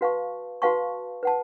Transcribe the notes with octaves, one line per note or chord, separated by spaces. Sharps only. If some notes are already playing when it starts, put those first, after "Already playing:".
F#4 B4 F5 A5 C#6
F#4 B4 F5 A5 C#6
B4 F#5 A5